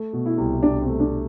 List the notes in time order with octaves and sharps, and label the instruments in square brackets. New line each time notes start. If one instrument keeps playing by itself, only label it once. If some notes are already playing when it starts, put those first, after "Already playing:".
Already playing: [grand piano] A3
B2
[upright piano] E4
[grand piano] C2
[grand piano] C2 [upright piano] D4
[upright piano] C4
[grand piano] A3
[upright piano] D4